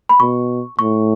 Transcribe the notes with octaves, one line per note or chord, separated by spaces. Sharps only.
B5
B2 C#6
A2 C#6